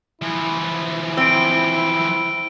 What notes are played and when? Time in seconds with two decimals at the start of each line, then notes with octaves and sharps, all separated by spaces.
0.22 E3 F3 E4
1.17 C4 E6 D7